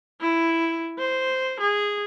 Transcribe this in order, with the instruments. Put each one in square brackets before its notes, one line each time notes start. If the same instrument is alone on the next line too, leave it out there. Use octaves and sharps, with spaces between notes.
[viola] E4
C5
G#4